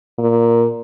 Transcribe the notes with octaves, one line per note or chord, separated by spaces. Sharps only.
A#2